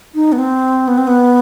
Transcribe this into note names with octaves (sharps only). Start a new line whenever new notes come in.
D#4
B3
C4
B3
C4
B3